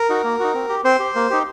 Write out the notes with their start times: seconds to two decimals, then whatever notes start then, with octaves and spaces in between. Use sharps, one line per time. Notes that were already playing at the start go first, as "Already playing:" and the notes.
Already playing: A#4
0.10 D#4 F#4
0.24 A#3
0.40 D#4 F#4
0.54 C4
0.69 G4
0.84 C4 C5
0.99 G4
1.15 A#3
1.30 D#4 G4